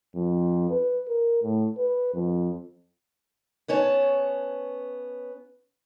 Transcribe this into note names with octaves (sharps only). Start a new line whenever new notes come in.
F2
B4
A#4
A2
B4
F2
B3 C#4 C#5 A5